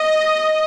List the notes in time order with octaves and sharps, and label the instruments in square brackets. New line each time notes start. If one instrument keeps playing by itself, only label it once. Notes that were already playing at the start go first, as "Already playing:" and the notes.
Already playing: [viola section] D#5